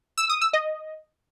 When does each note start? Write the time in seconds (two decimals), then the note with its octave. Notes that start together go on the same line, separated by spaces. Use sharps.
0.18 E6
0.30 D#6
0.41 E6
0.53 D#5